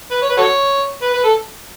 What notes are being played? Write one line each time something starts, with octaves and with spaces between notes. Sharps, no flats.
B4
C#5
B4
F#4 A4 C#5
B4
B4
A4